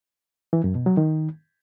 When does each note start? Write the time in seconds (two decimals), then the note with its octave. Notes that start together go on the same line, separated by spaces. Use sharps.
0.53 E3
0.64 F#2
0.75 B2
0.86 F#3
0.97 D#3